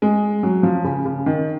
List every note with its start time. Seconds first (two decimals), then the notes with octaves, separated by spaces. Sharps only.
0.02 G#3
0.43 F#3
0.63 F3
0.84 C#3
1.06 C#3
1.26 D#3